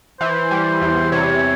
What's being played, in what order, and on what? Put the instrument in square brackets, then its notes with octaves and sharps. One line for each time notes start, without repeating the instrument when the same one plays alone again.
[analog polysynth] E3 [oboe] C5
[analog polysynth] G3
E2
[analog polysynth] C3 [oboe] C#5